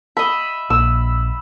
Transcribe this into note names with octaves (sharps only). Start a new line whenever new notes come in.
D#5 E5 B5
A#1 E6